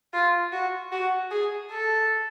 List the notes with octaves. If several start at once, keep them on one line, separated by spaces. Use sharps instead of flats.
F4
F#4
F#4
G#4
A4